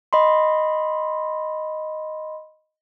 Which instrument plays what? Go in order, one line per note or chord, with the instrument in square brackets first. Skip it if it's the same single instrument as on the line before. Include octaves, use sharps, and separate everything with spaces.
[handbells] D#5 B5 C6